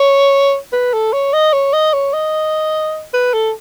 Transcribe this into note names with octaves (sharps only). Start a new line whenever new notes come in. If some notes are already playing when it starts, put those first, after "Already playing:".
Already playing: C#5
B4
A4
C#5
D#5
C#5
D#5
C#5
D#5
B4
A4